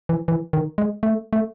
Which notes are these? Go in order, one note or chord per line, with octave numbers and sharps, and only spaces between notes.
E3
E3
D#3
G#3
A3
A3